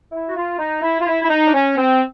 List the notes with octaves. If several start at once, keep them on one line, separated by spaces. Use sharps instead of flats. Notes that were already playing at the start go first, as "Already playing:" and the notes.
E4
F#4
F4
D#4
E4
F4
E4
E4
D#4
D4
C#4
C4